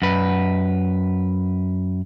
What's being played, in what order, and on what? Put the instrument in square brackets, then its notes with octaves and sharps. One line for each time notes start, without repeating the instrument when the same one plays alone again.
[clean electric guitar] F#2 B4